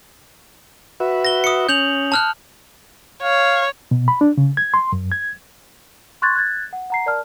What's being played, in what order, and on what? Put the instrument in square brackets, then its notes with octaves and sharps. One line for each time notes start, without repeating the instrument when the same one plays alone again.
[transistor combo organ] F#4 B4 E5
[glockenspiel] A#6 G7
D#6 C#7
[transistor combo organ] C#4 [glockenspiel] G6 F7 F#7
[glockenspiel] A5 F6 F#6
[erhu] C#5 [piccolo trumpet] F5
[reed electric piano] B2
B5
D4
C#3
G#6
C6
F#2
G#6
[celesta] C6 C#6 F#6 G#6 A6
F#6 G#6 A6
F#5
F#5 A#5 C7
A#4 D5 A5 F6